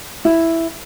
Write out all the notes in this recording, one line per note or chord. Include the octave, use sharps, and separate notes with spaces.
E4